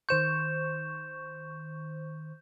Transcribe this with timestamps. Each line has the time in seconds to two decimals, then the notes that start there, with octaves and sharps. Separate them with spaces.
0.09 D#3 C5 C#6 G6 E7